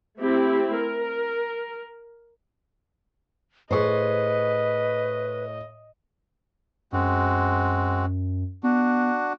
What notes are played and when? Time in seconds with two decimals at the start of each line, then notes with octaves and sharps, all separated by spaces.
0.19 A3 C4 E4 G4
0.76 A#4
3.71 A2 G#4 B4 C5 D#5 C#6
6.92 F#2 G#3 C4 F#4
8.63 B3 D4 F#4